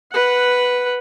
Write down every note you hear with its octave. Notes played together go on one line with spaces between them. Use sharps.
B4 F#5